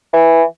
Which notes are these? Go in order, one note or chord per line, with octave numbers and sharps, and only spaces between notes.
E3